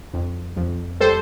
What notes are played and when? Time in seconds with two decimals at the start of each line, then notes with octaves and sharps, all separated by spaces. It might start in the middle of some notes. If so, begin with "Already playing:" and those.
0.14 F2
0.56 F2
1.00 G3 A4 C5